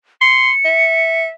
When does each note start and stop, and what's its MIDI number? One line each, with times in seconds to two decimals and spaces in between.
0.21 0.51 84
0.21 1.25 97
0.65 1.31 76